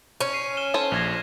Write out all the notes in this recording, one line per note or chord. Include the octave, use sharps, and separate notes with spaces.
C#4
C7 D#7
F6 E7 G7
A4 C5 C#5
A#1 F6 G#6 A#6